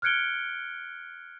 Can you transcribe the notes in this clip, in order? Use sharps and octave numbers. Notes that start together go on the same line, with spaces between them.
F6 F#6 G#6 C#7 D7 G7